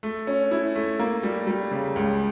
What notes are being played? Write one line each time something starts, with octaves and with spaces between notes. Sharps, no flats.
A3
C#4
E4
A3
A#3
G3
G3
C#3
C#2